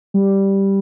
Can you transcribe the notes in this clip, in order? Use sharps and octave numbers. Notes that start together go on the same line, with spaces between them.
G3